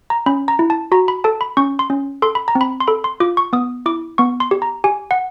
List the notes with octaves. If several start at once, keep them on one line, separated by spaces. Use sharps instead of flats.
A#5
C#4 B5
A#5
E4
A5
F#4 A#5
B5
A4 A5
B5
C#4 C#6
C6
C#4
A4 C6
B5
A#5
C4
B5
C6
A4 B5
C6
F4 D6
C#6
B3 D#6
E4 D6
B3 C#6
C6
G4
A#5
G4 G#5
F#5